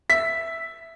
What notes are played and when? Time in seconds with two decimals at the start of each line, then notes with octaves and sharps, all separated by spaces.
0.09 E5 B6